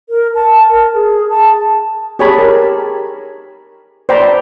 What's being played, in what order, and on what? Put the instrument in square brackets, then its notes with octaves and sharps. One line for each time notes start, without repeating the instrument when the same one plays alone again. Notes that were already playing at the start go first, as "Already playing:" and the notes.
[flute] A#4
A5
A#4
G#4
A5
[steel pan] G4 G#4 C#5 G#5 A5 B5
A#4
C5 D5 G5 A#5 B5